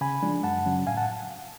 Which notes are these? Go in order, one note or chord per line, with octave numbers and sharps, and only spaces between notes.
C#3 G#5 B5
F3 G#3 D4
F#2 F#5 A5
C#3 F#3 C#4
A2 F5 G#5
F#5 A5